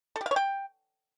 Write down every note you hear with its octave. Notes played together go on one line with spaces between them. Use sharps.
A4
G4
F5
C#5
G5